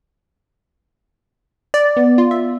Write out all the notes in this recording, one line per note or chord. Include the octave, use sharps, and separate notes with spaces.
D5
B3
F4
E5